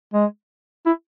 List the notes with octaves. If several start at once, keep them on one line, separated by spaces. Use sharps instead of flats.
G#3
E4